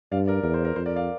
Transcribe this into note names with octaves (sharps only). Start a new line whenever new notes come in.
G2 D5 F5
A#4 D5
E2 A#4
C5
A#4
F2 C5
A#4 D5
D5 F5